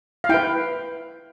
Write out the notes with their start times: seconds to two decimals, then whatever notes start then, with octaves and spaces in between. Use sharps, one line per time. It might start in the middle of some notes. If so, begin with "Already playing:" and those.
0.24 F5
0.29 E4 B4 G5